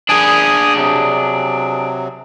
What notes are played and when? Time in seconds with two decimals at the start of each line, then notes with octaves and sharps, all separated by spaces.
0.09 D4 G#4 G#5 D#6
0.76 C3 F#3